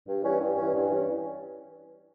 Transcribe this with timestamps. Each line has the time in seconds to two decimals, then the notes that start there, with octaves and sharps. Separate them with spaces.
0.07 G2
0.23 E3 G3 C#4
0.40 G2
0.57 E3 G3 C#4
0.74 G2
0.90 E3 G3 C#4